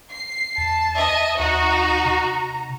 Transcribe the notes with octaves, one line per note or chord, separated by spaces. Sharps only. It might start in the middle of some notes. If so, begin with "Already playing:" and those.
C7
E2 A5
D#5 E5
D#2 D#4 F#4 A#5
C3